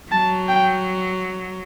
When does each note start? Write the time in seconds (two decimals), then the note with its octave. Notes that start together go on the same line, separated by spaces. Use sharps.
0.12 F#3 A5
0.48 G5